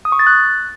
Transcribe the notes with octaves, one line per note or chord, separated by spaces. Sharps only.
D#6
C#6
A6
F#6